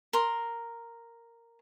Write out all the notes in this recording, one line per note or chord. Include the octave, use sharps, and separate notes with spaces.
A#4 C6